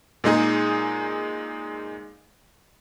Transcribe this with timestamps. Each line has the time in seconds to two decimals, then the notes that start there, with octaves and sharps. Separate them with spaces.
0.24 A#2 G#3 D#4 G#4